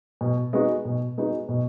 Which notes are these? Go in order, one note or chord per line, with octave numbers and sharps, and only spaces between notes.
B2
G#3 B3 D#4 F#4
B2
G#3 B3 D#4 F#4
B2